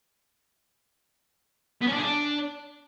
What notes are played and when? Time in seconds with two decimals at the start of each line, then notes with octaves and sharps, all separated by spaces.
1.81 B3
1.87 C#4
1.92 D4
1.97 G#4
2.03 D4